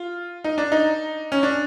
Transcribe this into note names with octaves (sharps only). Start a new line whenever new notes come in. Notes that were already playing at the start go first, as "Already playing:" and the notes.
Already playing: F4
D#4
D4
D#4
C#4
D4